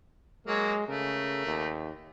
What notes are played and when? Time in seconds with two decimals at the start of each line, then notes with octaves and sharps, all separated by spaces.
0.47 F#3 G#3 A#3 C#5
0.88 C#3 A3 A#4
1.47 D#2